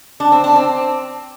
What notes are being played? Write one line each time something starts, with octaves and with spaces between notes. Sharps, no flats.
D4
C4
D4
C4